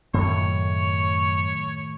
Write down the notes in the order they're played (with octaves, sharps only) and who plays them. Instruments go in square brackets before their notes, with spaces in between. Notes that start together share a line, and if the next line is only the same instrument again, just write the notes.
[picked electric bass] F#2 [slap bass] A2 D#3 A3 [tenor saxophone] C#5